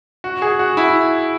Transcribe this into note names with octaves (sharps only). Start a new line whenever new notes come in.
F#4
G#4
F#4
E4